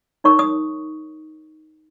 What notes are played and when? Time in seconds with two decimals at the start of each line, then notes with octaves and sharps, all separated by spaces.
0.24 D#4 A#4 C#5 C#6
0.39 D#6